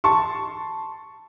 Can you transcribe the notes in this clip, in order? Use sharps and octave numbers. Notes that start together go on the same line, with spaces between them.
A5 C6 C#6